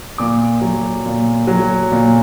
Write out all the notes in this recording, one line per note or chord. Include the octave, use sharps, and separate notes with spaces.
A#2 D6
F#3
A#2
F#3
A#2